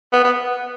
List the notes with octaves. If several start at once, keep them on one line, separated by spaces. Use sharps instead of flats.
B3
B3